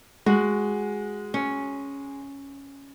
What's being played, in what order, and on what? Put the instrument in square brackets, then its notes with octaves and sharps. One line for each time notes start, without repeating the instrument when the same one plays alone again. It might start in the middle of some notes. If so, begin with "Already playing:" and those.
[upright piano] G#3 [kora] F#4
[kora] C#4